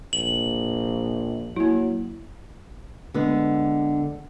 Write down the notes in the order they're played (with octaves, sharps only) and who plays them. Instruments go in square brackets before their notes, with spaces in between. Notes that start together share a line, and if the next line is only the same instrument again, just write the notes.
[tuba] A#1 [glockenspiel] F#7
[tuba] F#3 [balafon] A#3 E4
[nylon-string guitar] D3 G#3 B3